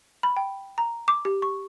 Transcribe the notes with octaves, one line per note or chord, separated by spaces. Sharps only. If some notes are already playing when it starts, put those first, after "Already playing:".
B5
G5
A#5
D6
G4
C#6